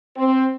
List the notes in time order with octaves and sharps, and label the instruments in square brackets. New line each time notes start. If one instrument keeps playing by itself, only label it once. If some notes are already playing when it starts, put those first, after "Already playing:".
[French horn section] C4